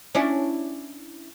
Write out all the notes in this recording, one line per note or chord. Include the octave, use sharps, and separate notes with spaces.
C#4 D4 E4